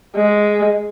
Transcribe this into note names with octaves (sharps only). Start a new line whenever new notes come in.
G#3